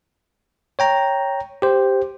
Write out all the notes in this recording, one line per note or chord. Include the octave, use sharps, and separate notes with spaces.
C#5 G5 A#5
G4 C5